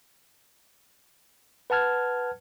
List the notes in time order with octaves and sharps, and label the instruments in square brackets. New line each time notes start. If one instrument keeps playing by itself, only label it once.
[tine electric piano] B4 F#5 A5 F6 G#6